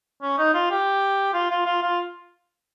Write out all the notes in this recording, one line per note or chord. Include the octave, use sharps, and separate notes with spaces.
C#4
D#4
F4
G4
F4
F4
F4
F4